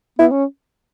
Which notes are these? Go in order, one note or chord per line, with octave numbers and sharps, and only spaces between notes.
B3 E4
C#4